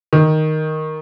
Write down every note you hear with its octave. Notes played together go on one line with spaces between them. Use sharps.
D#3